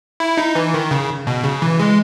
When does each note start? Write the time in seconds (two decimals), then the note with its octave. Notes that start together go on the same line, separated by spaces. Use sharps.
0.20 E4
0.37 D#4
0.55 E3
0.74 D#3
0.91 C#3
1.27 B2
1.44 C#3
1.62 E3
1.80 G#3